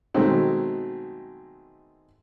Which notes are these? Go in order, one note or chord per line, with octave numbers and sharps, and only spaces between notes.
B2 D#3 F#3 G#3 A3 C4